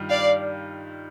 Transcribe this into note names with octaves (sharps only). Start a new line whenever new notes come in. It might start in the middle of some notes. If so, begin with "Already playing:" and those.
Already playing: G2 D#3 G3 F4
D5 F5